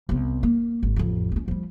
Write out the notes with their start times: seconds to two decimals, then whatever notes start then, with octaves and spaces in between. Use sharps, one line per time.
0.09 C2 B3
0.43 A#3
0.83 G#1
0.96 A1 F2
1.32 B3 C#4
1.48 F3 G3